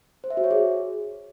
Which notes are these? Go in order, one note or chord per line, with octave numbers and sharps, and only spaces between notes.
C5
E5
F#4
C#5
G#4